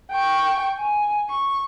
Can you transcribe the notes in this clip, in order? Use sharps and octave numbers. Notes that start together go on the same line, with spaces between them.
G5 C#6
G#5
C#6